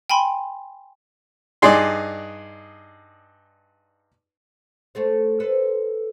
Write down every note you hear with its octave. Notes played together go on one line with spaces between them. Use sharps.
G5 G#5 B5 C6
G2 D#4 G#4 D5 C6
A3 A4 C5
A4 B4 C5